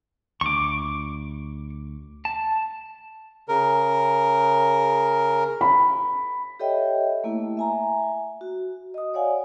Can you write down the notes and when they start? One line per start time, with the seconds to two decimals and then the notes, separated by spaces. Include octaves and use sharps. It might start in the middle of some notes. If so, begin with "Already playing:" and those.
0.41 D2 C#6 D6
2.25 A5
3.49 C#3 A#4
5.61 B5
6.60 G4 A4 C#5 D#5 E5 G5
7.24 A3 A#3 E4
7.57 E5 G#5 A#5
8.41 F#4
8.94 D#5 D#6
9.14 C#5 D5 F5 F#5 G#5